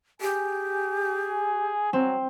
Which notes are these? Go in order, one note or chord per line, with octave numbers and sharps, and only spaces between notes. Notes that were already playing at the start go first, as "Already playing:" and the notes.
G4 G#4 G#5
F#3 C4